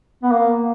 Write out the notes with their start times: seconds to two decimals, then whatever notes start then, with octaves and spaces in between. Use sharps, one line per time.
0.23 B3
0.32 A#3